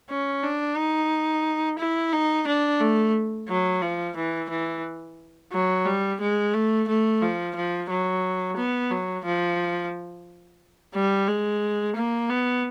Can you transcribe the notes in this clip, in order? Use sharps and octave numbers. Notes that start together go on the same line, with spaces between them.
C#4
D4
D#4
E4
D#4
D4
A3
F#3
F3
E3
E3
F#3
G3
G#3
A3
A3
F3
F3
F#3
B3
F#3
F3
G3
G#3
A#3
B3